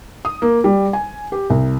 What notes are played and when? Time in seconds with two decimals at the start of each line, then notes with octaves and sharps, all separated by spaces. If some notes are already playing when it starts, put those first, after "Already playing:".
0.25 D#6
0.42 A#3
0.64 G3
0.93 G#5
1.32 G4
1.50 C2